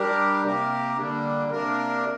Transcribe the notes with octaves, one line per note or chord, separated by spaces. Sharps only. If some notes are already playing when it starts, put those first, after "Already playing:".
Already playing: G3 D4 G4 A#4
C3 A#3 G4 A#4
D3 G3 A#3 D4
C3 A#3 D4 A#4